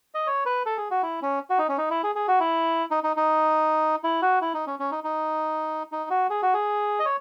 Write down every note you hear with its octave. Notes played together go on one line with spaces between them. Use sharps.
D#5
C#5
B4
A4
G#4
F#4
E4
C#4
F#4
D#4
C#4
D#4
E4
G#4
G#4
F#4
E4
D#4
D#4
D#4
E4
F#4
E4
D#4
C#4
C#4
D#4
D#4
D#4
F#4
G#4
F#4
G#4
D#5
C#5